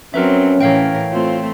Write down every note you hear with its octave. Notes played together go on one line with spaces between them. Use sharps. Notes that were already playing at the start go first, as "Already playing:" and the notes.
F#3 C4 C#4 A#4 B4 E5
A2 E3 A#4 C#5 F5 G5
A3 C4 F4 C5